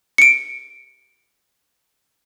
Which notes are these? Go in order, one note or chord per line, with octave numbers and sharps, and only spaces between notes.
C#7 D7